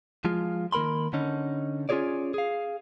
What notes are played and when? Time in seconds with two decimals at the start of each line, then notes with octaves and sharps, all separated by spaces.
0.25 F3 G#3 F4
0.72 D#3 A#3 A#4 B5 C6
1.13 D3 C#4 D#4
1.89 C#4 F4 F#4 G#4 C#5 D5
2.34 G#4 F5